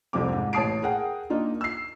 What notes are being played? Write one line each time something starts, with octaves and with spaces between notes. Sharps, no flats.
F1 C2 F2 C4 D6
G#2
A1 C#5 A5 D#6 C7 D7
G#4 A#4 F#5 G5
A#3 D4 D#4 F4
E6 C7